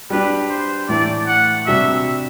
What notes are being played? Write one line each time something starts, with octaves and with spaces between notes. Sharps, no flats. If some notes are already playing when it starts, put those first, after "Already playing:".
G3 D4 G4 B4
C5
A2 E3 A3 D5
F#5
C3 G3 D4 F#4 E5